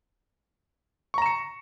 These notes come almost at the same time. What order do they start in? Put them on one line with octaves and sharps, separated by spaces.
C#6 A#5 E7 C#7